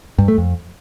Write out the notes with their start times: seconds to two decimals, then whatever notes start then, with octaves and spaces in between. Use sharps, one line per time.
0.18 G2
0.28 A3
0.38 F2